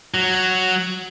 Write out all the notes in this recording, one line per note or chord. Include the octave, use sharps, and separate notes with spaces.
F#3